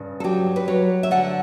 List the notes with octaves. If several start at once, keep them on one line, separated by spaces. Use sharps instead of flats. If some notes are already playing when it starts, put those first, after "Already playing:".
Already playing: G2 C#3
A4
F#3 G4
B4
F#3 C#5
E5
D3 F#5